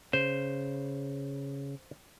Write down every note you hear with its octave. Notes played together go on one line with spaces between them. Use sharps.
C#3 C5